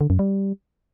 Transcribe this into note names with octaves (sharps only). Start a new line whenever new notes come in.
D3
F#2
G3